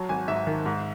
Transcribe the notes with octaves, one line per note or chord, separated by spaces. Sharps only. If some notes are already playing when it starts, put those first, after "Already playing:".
Already playing: F#3 A5
G#1 G#5
G#2 E5
D#3
G#2